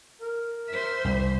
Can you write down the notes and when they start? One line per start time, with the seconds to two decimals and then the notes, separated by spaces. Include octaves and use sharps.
0.21 A#4
0.68 C5 E5
1.05 C2